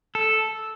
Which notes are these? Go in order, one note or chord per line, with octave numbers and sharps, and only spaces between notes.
A4